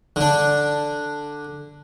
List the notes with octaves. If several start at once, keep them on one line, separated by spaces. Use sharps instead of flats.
D3 D4